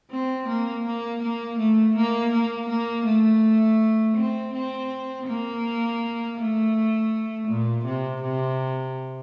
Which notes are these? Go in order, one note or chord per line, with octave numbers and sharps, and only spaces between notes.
C4
A#3
A#3
A#3
A3
A#3
A#3
A#3
A3
C4
C4
A#3
A3
A#2
C3
C3